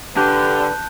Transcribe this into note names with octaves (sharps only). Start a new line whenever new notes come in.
D3 G4 B4 A5 F#6 G6